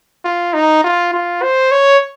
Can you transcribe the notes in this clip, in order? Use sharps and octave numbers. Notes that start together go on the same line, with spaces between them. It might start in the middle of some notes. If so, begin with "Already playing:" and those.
F4
D#4
F4
F4
C5
C#5